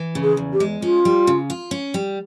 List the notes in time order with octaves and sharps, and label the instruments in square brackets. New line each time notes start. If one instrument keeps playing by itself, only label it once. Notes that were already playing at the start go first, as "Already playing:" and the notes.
Already playing: [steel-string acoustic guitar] E3
C#3
[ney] G#4
[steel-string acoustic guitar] E2
[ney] G4
[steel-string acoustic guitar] G#3
[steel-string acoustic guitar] C#4 [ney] F4
[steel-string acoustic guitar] G3
C#3
F4
C#4
G3